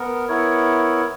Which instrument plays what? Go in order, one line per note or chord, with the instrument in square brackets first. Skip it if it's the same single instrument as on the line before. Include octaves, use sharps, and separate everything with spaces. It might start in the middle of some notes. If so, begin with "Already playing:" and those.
Already playing: [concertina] B3 A#4
B3 E4 A#4 C#5